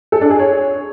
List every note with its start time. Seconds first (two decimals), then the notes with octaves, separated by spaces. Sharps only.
0.12 A4
0.21 D4
0.30 G#4
0.39 C#5